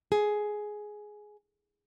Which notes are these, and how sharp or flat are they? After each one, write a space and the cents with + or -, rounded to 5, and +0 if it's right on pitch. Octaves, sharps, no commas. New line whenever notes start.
G#4 +10